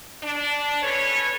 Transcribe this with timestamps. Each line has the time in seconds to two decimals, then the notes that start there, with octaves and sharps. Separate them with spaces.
0.23 D4
0.82 C#4 A4 B4 C#5